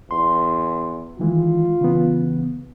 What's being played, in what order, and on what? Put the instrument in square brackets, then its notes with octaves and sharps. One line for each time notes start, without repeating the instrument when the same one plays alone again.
[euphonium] E2 [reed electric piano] C6
[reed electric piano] D#3 E3 G#3 [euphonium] F4
[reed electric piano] C#3 E3 B3